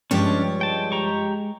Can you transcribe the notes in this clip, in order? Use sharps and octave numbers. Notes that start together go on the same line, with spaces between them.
G2 F3 G#3 C#4 D4 G4 C#5
G5 A5
G4 A#5 C#6